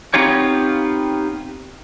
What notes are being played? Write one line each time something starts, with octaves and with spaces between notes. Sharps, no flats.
B3 C4 D#4 F4 G4 C#5